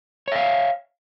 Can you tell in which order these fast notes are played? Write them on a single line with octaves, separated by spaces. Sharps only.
C#5 E5 F5